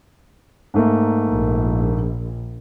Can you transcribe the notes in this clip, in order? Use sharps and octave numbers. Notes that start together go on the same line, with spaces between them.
G#2 A3 A#3
A#1